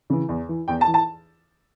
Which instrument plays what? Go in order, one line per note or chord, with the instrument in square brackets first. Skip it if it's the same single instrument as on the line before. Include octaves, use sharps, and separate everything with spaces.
[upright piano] C#3 E3
E2
E3
E2 G5
A5
E3
A5